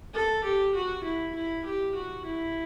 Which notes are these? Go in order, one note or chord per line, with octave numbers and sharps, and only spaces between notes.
A4
G4
F#4
E4
E4
G4
F#4
E4